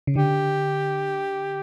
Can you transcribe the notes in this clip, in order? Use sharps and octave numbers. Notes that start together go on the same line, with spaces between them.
C#3
D3 G4